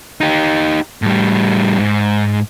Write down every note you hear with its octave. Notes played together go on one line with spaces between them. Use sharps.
D#4 G4
A2 G3
G#2